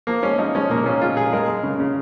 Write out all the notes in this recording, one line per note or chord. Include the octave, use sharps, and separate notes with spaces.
F3 A#3
G#3 C#4
F3 D#4
G#3 C#4
A#2 A#3
A#2 C#4
G#3 F4
A#2 G#4
G#3 A#4
G#3
C#3
C#3